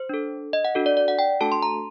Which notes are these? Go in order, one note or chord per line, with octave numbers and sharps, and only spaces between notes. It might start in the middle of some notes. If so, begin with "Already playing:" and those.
Already playing: C5
D4 A4
D#5
F#5
D4 F#4 A4
D5
D5
F#5
G5
A3 D4 F#4 A4 A5
C6
A#5